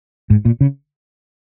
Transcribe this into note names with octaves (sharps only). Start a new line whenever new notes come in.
G#2
A#2
C#3